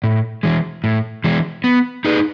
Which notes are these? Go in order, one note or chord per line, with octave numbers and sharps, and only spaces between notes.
A2
E3 G#3
A2
E3 G#3
B3
D#4 G#4 B4